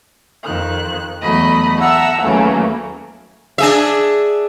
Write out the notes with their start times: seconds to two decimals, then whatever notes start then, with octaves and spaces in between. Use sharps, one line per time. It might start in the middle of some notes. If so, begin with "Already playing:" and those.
0.43 F2 D#3 F#6
1.21 E2 F#3 A3 D#5 B5
1.78 E5 F#5 A5 A#5 E6
2.21 D#2 C#3 E3 F#3 A3 A#3
3.58 D4 G#4 E5